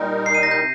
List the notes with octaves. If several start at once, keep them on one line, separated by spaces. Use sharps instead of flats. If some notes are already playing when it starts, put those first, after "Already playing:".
Already playing: A#2 G3 D#4 A#4
C7
D#7
A#6
G6
C3